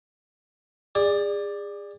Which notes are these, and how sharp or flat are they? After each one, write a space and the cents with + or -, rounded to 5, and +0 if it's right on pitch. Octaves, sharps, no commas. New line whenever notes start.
G#4 -30 D5 +5